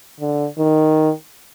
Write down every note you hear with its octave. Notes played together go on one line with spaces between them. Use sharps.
D3
D#3